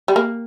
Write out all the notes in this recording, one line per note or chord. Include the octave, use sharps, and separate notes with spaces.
G3
A#3